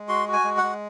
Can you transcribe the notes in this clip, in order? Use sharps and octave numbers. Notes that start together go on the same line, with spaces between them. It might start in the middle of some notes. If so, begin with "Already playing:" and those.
Already playing: G#3
F#4 C6
F#4
G#5
G#3
F#5
G#3